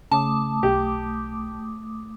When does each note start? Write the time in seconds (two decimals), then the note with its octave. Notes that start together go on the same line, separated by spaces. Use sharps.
0.11 C#3 A3 A5 D6 D#6
0.63 B1 G4